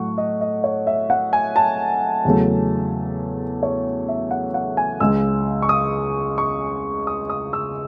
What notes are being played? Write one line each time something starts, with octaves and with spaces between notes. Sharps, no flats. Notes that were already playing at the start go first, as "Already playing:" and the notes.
Already playing: A2 F#3 A3 F#5 C#6
D#5
D#5
C#5
E5
F#5
G#5
A5
E2 C#3 F#3 A3
C#5
E5
F#5
F#5
G#5
C#2 C#3 G#3 E6
C#6
D#6
C#6
D#6
D#6
E6